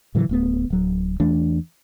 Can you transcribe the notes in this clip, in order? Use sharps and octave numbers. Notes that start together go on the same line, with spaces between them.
A2 C#3 E3 F#3
D1 A3 B3
D1 F#3
E2 E3 A3 D4